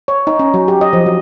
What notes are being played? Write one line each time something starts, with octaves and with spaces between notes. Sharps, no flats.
C#5
D#4
C#4
F#3
G4
D#5
F3
F#3